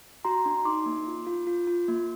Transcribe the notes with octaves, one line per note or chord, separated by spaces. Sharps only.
F#4 A#5 C6
D4
D#4 C6 D6
A#3
F4
F4
F4
F4
A#3